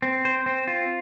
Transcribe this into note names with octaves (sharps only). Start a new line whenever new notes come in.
C4
C5
C4
F4